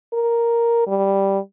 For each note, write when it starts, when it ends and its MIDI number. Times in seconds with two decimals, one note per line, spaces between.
0.13 0.85 70
0.87 1.39 55